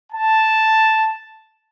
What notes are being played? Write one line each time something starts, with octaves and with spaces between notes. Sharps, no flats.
A5